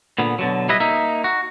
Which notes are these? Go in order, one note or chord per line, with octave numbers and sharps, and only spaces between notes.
A#2 D3 B3
B2 D3 F#3
G3 E4 B4 D#5
A#3 D#4 E5
F#4